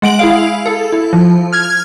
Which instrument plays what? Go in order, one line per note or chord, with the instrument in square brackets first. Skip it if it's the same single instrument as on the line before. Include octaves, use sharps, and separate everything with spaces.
[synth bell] G#3 F#5 D7 F#7
E4 G#4 F5
A4
E4
F3
F6 G#6